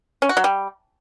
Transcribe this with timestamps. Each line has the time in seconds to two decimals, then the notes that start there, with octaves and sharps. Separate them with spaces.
0.22 C#4
0.29 F#4
0.37 F#3
0.44 G3